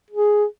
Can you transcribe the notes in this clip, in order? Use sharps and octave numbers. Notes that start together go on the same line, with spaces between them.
G#4